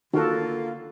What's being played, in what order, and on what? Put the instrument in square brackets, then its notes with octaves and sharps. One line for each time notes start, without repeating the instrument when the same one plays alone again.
[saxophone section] D3 A#3 F4 [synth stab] D#3 [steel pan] F#4 A4